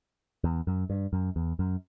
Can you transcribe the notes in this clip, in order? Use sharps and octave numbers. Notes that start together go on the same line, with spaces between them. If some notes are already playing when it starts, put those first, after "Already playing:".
E2
F#2
G2
F#2
E2
F#2